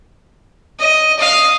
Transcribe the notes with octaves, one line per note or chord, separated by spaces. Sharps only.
D#5
D#5 F5